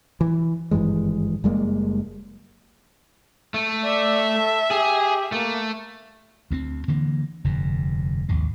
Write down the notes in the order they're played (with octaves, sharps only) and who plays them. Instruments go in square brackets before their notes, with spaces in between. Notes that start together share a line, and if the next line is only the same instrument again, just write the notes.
[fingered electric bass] E3
G#1 G2 E3 G#3
F#1 G3 G#3 A#3
[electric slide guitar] A3
[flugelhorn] D5 [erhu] E5
[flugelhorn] A4
[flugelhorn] G4 [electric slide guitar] G#4
[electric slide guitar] A3 [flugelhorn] A#3
[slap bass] D2 B3 C4
D3 E3 A#3
F1 G2 D3
A#1 D#2 G#2 G#3